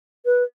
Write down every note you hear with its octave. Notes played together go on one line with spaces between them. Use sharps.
B4